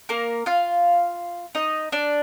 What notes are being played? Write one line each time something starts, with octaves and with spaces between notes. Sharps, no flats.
A#3 A#4
F4 F5
D#4 D#5
D4 D5